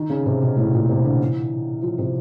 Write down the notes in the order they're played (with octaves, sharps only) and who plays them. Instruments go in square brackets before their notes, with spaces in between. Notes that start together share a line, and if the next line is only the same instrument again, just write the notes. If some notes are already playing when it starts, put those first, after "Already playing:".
Already playing: [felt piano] D#3
C#3
C3
B2
A2
A#2
C3
D3
E3
F3
C3